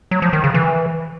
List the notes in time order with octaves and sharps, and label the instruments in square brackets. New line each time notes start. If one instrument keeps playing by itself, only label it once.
[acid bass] F#3
F3
D#3
C#3
E3